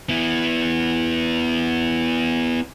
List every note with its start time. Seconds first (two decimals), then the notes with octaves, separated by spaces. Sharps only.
0.09 B3 E4